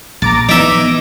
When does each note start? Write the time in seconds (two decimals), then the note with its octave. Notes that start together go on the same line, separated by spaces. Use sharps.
0.22 A#1 A#5 D6 A6
0.49 E3 B3 D#4 E5 D6 B6 D7